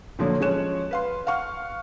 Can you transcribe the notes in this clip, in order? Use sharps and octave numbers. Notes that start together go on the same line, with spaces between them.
A#2 D3 F3 F#3
F3 G#3 C#4 C#5 F#6 E7
B4 F5 C6
F5 F#5 C#6 F6